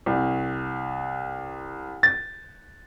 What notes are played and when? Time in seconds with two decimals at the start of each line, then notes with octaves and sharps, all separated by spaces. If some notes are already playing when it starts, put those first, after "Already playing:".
0.06 C2
2.03 A6